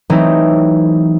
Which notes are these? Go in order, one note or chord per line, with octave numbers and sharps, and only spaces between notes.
E3 F#3 A3 C4 D#4